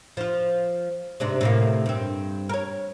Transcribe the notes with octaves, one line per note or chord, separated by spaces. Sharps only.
F3 F4
G#2 C3 D4
A2 C3 A#3
G2 C4
A#4 C#5